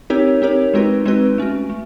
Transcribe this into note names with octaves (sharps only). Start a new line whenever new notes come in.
C4 D#4 G4 A#4 C#5
C4 D#4 G4 A#4 C#5
G#3 C4 D#4 F#4 B4
G#3 C4 D#4 F#4 B4
A3 C#4 F#4
A3